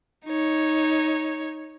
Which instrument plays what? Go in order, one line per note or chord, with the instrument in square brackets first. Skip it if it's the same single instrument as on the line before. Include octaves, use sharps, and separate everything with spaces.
[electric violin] D#4 C#5